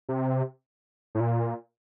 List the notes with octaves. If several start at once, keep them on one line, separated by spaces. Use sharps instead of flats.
C3
A2
A#2